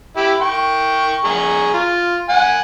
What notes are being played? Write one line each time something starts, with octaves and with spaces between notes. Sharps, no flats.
E4 G4
G5 C#6
G#4 A#5 C#6
F4
F#5 G#5